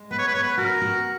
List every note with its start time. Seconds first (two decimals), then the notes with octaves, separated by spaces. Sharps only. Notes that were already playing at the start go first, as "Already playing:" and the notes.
Already playing: G#3
0.11 B3 B4
0.18 C#5
0.28 B4
0.34 B3 C#5
0.43 B4
0.58 F#4 A#4
0.82 F#4